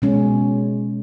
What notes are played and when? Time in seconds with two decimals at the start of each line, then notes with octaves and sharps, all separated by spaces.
0.02 B2 G#3 C#4